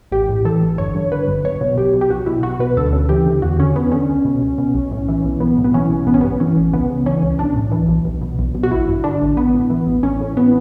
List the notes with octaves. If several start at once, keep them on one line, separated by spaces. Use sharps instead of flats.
A1 G4
A2
E3 A4
A1
G1 C#5
G2
D3 B4
G1
B1 C#5
B2
B1 G4
B2
G4
B1 F#4
B2 E4
B1 F#4
B2 B4
D2 A4
C#3
E3 G4
D2
E2 F#4
D3 C#4
E2 B3
D3 C#4
C#2
B2
C#2
B2
B1
A2
E3
B1
B1 B3
A2
B3
E3 C#4
B1
A1 B3
C#4
G2 B3
E3 C#4
A1
C#2 B3
C#3
E3 C#4
C#2
B1 D4
A2
E3
B1
B1
B2
B1
B2
F#4
A1 E4
G2
D3 D4
A1
A1 B3
A2
E3
A1
A1 C#4
A2
E3 B3